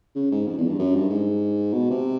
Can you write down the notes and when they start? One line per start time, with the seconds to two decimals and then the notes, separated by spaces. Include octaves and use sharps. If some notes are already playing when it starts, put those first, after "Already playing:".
0.15 C#3
0.31 G#2
0.46 F2
0.57 E2
0.67 G2
0.79 F#2
0.95 G2
1.10 G#2
1.73 B2
1.90 C3